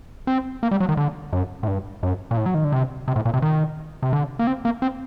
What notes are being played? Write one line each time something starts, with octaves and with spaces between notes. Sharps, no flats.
C4
A#3
G3
F#3
D#3
D3
F#2
A2
G2
F#2
A#2
A2
F#3
D#3
D3
C3
C3
A2
A#2
C3
D#3
C3
D3
A#3
C4
A#3
C4